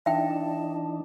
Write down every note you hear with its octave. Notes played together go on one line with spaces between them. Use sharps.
E3 D4 D#4 E5 G5 A5